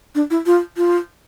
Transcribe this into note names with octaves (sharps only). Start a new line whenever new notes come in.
D4
E4
F4
F4